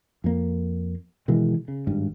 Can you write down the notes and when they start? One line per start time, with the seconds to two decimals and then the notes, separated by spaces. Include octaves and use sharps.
0.24 F2 A#3
1.28 B2 D#3 E3 G#3
1.68 C#3
1.87 G#1 G2